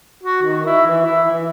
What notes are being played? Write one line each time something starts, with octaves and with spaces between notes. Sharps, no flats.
F#4
D#3
E4
E3
E4
E3